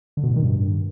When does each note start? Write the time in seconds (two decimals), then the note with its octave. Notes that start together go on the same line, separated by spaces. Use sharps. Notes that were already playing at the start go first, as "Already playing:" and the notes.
0.17 D3
0.23 B2
0.30 A2
0.36 D#3
0.43 G2